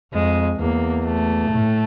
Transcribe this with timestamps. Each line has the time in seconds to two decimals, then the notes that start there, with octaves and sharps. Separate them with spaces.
0.13 F2 G#3
0.60 E2 A#3
1.05 A3
1.50 A2